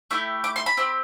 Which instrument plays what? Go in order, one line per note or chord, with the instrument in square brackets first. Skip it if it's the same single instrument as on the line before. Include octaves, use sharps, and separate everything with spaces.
[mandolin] A3 E4 G4
D6
C6
B5
C4 G4